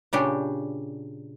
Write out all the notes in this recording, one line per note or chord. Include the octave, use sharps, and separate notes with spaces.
A#2 C#3 D4 G4